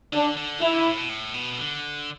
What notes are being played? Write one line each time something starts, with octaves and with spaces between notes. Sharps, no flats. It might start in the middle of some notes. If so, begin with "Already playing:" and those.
D3 D4
D3
E3 E4
D3
A2
B2
A2
B2
D3